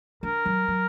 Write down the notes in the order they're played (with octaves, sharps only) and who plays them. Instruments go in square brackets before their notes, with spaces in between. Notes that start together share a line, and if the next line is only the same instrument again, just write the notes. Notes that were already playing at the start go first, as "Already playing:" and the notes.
[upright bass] D4 [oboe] A#4
[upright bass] F#3
F#3